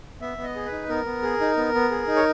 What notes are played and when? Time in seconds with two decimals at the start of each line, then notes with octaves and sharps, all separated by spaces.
0.20 B3 E5
0.37 B3
0.44 D#5
0.56 G#4
0.66 B4
0.71 D#4
0.88 B3 A#4
1.06 B3
1.23 G#4
1.41 D#4
1.57 B3
1.74 B3
1.91 G#4
2.07 D#4
2.16 C#5